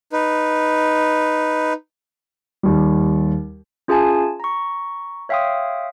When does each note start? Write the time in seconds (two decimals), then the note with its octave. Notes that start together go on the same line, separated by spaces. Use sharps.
0.13 D#4 B4
2.63 D#2 G3
3.88 C#4 F4 G#4 E5 G#5 A5
4.40 A#5 C#6
5.29 C#5 E5 F5 G5 C6 D#6